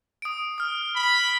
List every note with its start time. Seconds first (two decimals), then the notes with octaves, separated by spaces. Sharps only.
0.22 D#6 D7
0.58 D#6 F6
0.96 B5